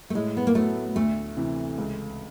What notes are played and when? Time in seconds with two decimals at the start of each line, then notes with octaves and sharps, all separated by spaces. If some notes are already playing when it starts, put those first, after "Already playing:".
0.10 A3
0.15 A2 G#3
0.37 B3
0.47 A#3
0.55 F#3 A3 B3
0.96 D2 A3
1.37 C3 E3
1.78 C#2